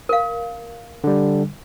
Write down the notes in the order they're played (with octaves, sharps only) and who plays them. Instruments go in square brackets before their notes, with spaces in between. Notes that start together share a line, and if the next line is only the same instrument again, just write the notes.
[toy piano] A#4 F5
[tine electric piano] D3 G3